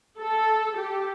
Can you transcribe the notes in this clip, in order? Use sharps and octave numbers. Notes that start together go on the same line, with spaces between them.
A4
G4